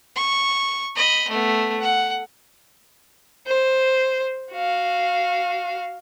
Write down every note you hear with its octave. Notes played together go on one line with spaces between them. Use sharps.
C#6
D#5 B5
A3 B3
F#5
C5
F#4 F5